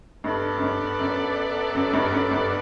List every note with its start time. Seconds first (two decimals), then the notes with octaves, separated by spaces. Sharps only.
0.24 G2 B3 D4 A4 D5
0.57 F#2
0.62 G2
0.99 F#2
1.75 F#2
1.93 G2
2.12 F#2
2.31 G2